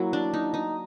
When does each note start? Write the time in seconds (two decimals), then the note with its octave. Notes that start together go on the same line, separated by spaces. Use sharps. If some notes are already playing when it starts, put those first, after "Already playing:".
Already playing: F#3 A#3 E4
0.13 D4
0.34 D#4
0.54 D#4